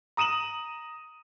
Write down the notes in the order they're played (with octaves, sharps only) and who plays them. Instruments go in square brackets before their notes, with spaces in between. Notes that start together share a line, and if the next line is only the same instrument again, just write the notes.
[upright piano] A#5 D#6 D#7 E7 F#7